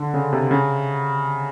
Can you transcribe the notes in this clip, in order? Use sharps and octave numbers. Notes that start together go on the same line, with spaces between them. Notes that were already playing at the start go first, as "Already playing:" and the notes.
Already playing: D3
C#3
C3
C#3